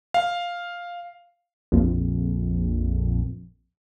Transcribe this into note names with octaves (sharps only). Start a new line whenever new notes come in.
F5
A#1 F2